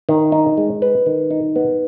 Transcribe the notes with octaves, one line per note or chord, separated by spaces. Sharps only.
D#3
D#4
G#3
B4
D#3
D#4
B3